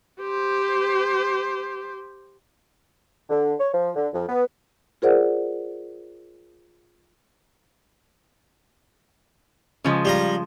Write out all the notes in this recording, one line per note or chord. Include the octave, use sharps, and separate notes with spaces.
G4 C5
D3
C#5
F3
D3
F2
B3
F4 G#4 A#4 C5 D5 F#5
C#3 F3 G#3
G3 F4 A#5